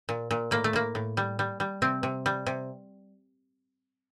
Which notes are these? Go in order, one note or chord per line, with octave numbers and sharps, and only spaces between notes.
A#2
A#2
A2 A#3
A3
A2 A#3
A2
G3
G3
G3
C3 C4
C3
G3
C3